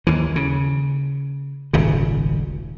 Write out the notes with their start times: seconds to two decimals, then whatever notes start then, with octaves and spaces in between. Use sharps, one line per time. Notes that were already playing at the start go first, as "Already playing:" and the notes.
0.07 D#2 E3
0.36 C#3
1.73 D#1 G#1 C#3